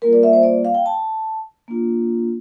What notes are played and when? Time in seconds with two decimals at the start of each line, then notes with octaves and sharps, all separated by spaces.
0.02 G3 A#3 F4 A#4
0.13 D5
0.23 E5
0.33 C5
0.43 D5
0.65 F5
0.74 G5
0.86 A5
1.68 A#3 D4 F4